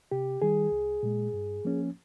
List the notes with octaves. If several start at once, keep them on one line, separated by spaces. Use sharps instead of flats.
C3 G4
D#3 G3 G#4
C2
A#2 G#3
G2
F3 A#3 C#4